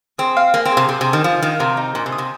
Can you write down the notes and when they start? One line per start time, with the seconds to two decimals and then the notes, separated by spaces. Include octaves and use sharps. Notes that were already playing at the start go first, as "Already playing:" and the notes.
0.18 C4 G#4
0.37 F5
0.54 A#3 G#4
0.65 C4
0.72 G#4
0.77 C3
0.89 C3 G#4
1.01 C3
1.07 G#4
1.13 D#3
1.24 F3 F5
1.42 D#3 F5
1.60 C3 A#4
1.77 D#4
1.95 A#2 G#5
2.06 C3
2.12 D#6
2.18 C3